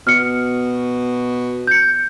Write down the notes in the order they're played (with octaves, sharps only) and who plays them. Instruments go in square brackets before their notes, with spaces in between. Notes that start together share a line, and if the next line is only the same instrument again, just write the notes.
[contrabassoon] B2 [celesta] F6 C#7
[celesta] G6 C#7